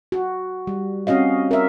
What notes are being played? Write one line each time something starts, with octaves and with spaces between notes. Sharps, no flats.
F#4
G3
C4 C#4 F#4 D#5 F5
A#4 E5